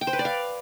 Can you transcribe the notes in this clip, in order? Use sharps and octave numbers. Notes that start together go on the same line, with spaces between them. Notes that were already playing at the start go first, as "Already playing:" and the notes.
G5
C5
B4
D5
F5